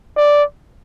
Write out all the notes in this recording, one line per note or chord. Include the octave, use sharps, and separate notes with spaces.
D5